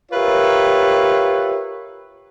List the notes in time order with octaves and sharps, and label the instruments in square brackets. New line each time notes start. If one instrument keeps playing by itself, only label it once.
[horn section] F4 G4 A#4 B4 C#5 E5